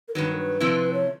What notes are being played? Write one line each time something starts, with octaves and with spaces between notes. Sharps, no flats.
A#4
G2 D#3 F#3 B4
A#4
B4
C3 F3 A3 C4 E4
C#5